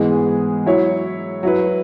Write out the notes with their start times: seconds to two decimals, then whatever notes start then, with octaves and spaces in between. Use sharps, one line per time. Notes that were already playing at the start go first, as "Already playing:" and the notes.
Already playing: G#2 E3 G#3 B3 G#4
0.66 F#3 E4 C#5
1.43 F#3 E4 B4